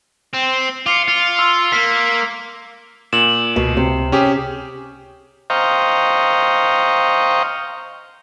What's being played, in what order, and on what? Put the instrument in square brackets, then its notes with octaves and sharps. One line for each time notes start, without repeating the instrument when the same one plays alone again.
[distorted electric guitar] C4
[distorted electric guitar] F4 [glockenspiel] D6 C7 C#7
[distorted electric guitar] F4
[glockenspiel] C6 E6
[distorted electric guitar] A#3 [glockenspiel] B6
[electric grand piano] A#2 [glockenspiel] E7 F#7
[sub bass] C#2 [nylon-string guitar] B2
[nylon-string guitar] C3
[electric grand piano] C#4 G4 G#4
[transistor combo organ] C5 D#5 F5 G5 A#5 C#6